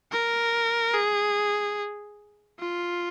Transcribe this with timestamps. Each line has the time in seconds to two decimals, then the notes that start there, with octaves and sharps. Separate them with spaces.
0.12 A#4
0.94 G#4
2.59 F4